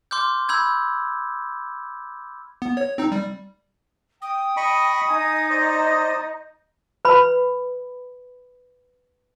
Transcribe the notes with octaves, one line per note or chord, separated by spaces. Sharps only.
C6 D6 F6 G6
B5 E6 G6 G#6
B3
C#5
C4 D#4
G3
G5 D#6
D#5 B5 C#6
D#4 G#5
C5 D5 D#5
B4 B5